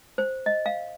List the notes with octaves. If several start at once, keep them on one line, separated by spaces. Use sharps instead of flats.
C5
D#5
F5